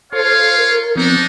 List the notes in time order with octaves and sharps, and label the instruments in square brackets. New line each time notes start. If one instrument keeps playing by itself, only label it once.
[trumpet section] F4 C#5 F5 [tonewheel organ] A4 C5
[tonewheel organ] A#4
[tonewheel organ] F3 B3 C4 [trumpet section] D4 D#4